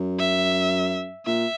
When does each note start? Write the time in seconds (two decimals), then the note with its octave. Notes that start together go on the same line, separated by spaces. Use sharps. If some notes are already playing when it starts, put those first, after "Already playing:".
Already playing: F#2
0.19 E5
1.26 A#2 E5